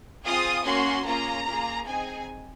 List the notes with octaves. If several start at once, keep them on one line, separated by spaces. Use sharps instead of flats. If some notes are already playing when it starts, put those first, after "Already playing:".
C4 F4 G#4 D#6
A#3 C#4 F#4 C6
A#3 C#4 F4 G#4 A#5
A#3 F4 G#4
C4 D#4 G#4 G#5